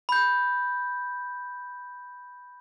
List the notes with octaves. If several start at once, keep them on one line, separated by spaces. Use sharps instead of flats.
B5 G6